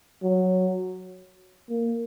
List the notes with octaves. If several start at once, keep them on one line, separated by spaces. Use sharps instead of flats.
F#3
A#3